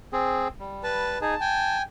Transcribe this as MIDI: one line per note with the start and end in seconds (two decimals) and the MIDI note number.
0.13 0.48 60
0.13 0.48 68
0.60 1.18 55
0.84 1.18 71
0.84 1.18 81
1.22 1.35 63
1.22 1.35 68
1.22 1.78 81
1.41 1.82 79
1.41 1.82 80